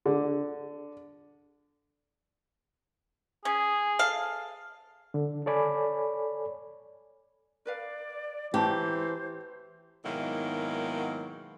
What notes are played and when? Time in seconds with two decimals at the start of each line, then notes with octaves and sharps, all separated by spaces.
0.06 D3
3.45 C#4 G#4
3.99 A4 F5
5.14 D3
5.46 A4 C#5 D5 G#5 B5
7.66 A#4 B4 D5 F5
8.54 E3 F#4 G4 C5 A5 A#5
10.04 G#2 B2 D#3 F#3 A#3 E4